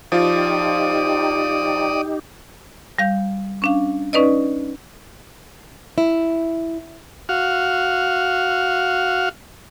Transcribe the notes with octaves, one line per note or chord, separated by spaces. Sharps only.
F3 D#4 F4 G4 D5 D#6
G3 F5 G6
C#4 D4 F5
C#4 D#4 B4 D5 D#5
E4
F#4 F5